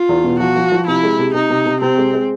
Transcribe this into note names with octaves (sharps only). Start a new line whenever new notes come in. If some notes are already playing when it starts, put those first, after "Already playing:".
Already playing: F4
E2
B2
F3 F#4
F3
F3
C3 E4
G#3
C3
C3 D#4
C3
C3
C3 C4
G#3
G#3